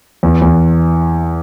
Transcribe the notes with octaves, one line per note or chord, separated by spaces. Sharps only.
E2
E2